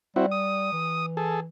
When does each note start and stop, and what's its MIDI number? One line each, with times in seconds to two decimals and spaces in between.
0.16 0.69 55
0.16 0.26 60
0.16 0.26 64
0.16 0.26 66
0.31 1.06 87
0.72 1.48 52
1.17 1.40 68
1.17 1.40 69